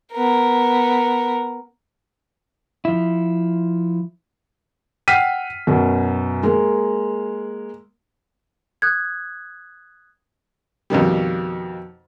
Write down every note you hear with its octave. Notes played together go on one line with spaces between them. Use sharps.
B3 A#4
F3 E4
F#5 G5 F6 B6 C7 D#7
F#2 B2
G#3 A#3
D#6 F#6 G#6
F2 B2 D#3 G3